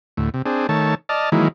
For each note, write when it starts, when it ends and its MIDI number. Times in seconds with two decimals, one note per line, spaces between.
0.17 0.30 38
0.17 0.30 45
0.34 0.42 48
0.46 0.67 60
0.46 0.67 62
0.46 0.67 68
0.69 0.95 51
0.69 0.95 57
0.69 0.95 73
0.69 0.95 81
1.09 1.30 74
1.09 1.30 75
1.09 1.30 81
1.09 1.30 89
1.32 1.48 51
1.32 1.48 52
1.32 1.48 54
1.32 1.48 56
1.32 1.48 58
1.32 1.48 64